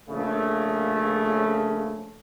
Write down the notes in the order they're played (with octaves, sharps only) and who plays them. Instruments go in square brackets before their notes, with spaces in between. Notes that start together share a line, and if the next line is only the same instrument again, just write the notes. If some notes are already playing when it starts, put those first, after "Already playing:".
[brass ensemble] A#1 C#3 A3